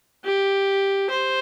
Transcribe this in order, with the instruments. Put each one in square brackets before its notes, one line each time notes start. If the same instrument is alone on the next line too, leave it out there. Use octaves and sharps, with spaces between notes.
[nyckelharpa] G4
C5